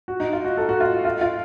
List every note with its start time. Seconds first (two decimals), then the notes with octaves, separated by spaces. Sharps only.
0.08 F#4
0.20 D#4
0.33 F4
0.45 F#4
0.57 A4
0.69 F#4
0.80 F4
1.05 F4
1.21 F4